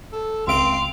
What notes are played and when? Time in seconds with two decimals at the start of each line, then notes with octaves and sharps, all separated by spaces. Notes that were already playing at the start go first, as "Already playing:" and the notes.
0.12 A4
0.47 C#2 C4 F5 C6 D7